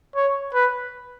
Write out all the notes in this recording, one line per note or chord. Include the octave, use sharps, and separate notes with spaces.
C#5
B4